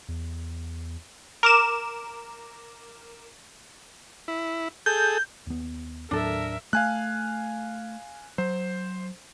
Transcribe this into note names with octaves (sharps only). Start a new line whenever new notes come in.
E2
A#4 D6 E7
E4
G#4 A4 G6
D#2 B3
D#2 A2 F#3 D4 A4 A#4 E5
A3 F5 G#5 F#6
F#3 C5